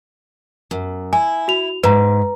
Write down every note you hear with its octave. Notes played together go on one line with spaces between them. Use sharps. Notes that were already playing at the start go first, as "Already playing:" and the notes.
F#2
E4 G#5
F#4 F7
G#2 B4 A#5